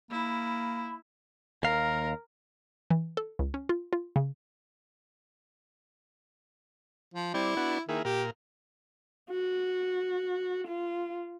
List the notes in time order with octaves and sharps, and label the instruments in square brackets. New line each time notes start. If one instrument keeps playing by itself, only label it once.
[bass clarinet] A#3 [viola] E4 [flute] B5
[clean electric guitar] D#2 F5 [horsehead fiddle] A#4
[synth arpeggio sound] E3
A4
C#2
C#4
F4
F4
C#3
[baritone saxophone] F3
[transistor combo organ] G3 C4 D5 [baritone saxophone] E4
[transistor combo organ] B3 D4 F#4
[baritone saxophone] D#3 [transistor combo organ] A#3 E4 G#4
[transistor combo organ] A#2 A#4 [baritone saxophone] G4
[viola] F#4
F4